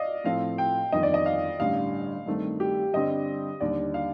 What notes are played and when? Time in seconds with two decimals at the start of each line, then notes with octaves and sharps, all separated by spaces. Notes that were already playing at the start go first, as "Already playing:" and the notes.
Already playing: D5 D#5 F5
0.24 A2 F3 C4 F4 A4 F5
0.58 G5
0.92 G1 F2 D#3 D#5
1.03 D5
1.14 D#5
1.26 F5
1.59 A1 G2 D3 G3 F5
2.26 G2 D#3 A3 C4
2.60 G4
2.93 G2 D3 G3 C4 G4 D#5
3.61 D#2 D3 G3 D5
3.94 F5